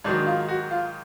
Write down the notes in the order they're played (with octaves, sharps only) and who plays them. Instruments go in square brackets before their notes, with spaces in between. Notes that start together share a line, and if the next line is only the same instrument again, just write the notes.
[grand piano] G#2 D#3 F#3 D4
F4
F#4
F4